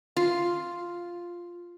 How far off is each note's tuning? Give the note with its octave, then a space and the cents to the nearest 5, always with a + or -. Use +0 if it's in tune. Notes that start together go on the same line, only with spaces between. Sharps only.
F4 +0